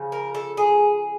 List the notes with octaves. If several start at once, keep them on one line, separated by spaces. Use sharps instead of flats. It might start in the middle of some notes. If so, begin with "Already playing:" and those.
Already playing: C#3 F3
A#4
A4
G#4